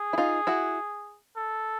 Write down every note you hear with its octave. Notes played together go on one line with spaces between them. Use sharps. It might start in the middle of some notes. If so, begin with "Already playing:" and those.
Already playing: G#4
E4
D#4 F4
E4 F#4
A4